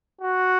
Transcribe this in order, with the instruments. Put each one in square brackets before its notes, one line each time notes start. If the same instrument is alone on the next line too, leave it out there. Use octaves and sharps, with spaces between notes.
[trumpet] F#4